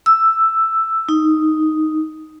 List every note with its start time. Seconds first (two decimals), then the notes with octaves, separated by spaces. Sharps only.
0.06 E6
1.09 D#4